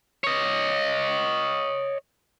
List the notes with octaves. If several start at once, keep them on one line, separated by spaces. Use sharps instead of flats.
C#5 D#5